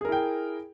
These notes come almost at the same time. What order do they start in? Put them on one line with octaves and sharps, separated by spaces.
G#4 A#4 E4 G5